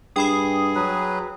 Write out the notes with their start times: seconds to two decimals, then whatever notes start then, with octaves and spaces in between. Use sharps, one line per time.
0.16 G2 G#4 G5 B5 D#6
0.75 F#3 B4